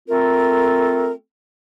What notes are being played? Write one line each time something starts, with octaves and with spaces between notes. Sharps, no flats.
A3 C4 F4 A4 A#4